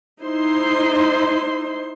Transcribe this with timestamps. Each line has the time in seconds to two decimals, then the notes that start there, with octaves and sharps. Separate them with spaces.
0.22 D#4 E4 C5 C6